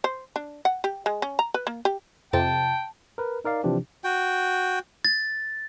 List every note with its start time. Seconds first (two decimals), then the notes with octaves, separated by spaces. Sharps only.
0.04 C5
0.36 D4
0.65 F#5
0.84 G4
1.06 G#3
1.22 C#4
1.39 A#5
1.54 B4
1.67 A#3
1.85 G4
2.33 F2 C3 G5 A5
3.18 A#4 B4
3.45 D#4 A#4 D5 F5
3.64 C3 E3 F3 D4 G4
4.04 F#4 G5
5.05 A6